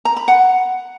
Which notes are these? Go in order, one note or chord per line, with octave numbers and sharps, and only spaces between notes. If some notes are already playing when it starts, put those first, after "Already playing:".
A#5
B5
F#5